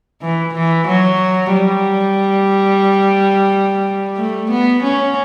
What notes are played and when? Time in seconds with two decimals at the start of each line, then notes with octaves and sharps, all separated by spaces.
0.22 E3
0.54 E3
0.88 F#3
1.54 G3
4.17 A3
4.51 B3
4.83 C#4